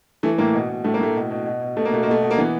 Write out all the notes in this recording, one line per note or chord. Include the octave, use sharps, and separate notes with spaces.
E3 A3
A2 A#3
B2
B2
A2 A3
A#3
A2 A3
B2
B2
B2
B2
B2 A3
A#3
B2 A3
A#3
B2 A3
B2
A#3
E3 B3